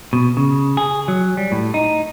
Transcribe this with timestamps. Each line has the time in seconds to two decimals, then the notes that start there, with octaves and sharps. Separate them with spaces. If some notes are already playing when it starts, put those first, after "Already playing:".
0.13 B2
0.37 C#3
0.77 G#4
1.08 F#3
1.37 G3
1.52 A2
1.74 D#4